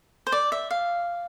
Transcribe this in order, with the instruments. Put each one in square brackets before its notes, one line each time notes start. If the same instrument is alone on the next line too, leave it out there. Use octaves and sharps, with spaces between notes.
[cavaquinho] C5
D5
E5
F5